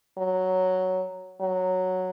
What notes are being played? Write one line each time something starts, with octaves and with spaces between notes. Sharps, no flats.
F#3
F#3